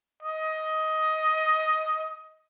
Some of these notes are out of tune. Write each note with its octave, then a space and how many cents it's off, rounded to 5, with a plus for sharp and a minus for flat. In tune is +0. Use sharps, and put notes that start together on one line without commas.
D#5 +15